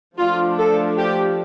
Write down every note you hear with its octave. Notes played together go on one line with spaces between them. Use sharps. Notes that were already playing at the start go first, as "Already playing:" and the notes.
F3 A3 D4 F4
A4
G4